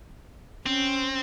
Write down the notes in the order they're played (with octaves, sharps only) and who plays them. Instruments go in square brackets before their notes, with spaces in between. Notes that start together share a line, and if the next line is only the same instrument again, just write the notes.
[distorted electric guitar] C4 [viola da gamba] C#4